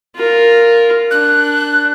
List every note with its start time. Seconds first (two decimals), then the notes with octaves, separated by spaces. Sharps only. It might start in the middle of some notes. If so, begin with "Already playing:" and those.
0.16 F4 A#4
1.11 D4 F#6